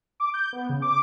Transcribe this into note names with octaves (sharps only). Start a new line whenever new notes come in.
D6
G6
B3
C#3
D6